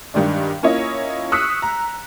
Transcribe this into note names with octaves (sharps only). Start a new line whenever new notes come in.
G2 D#3 G#3 D4
A#3 C#4 E4 F4 C#5 D#5
C#6 D#6 E6 F#6 B6 C#7
A#5